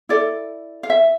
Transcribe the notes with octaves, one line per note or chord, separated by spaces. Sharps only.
E4 A4 D5
F5
E5